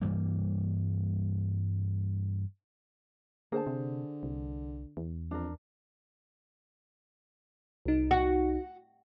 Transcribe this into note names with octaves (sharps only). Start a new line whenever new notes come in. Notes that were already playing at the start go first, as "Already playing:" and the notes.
G2 E3 G3 A#3
D3 A#3 G#4 C5 A5
C3
C2
E2
F2 D4 A#4
C2 D#4
F#4